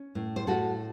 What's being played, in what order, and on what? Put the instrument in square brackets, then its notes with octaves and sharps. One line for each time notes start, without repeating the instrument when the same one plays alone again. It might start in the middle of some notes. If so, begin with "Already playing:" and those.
Already playing: [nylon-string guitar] C#4
A2
C5
A2 F#4 A4